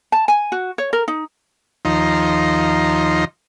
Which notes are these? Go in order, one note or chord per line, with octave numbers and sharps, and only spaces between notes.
A5
G#5
F#4
C#5
A#4
D#4
D#2 F3 D#4 A#5 C6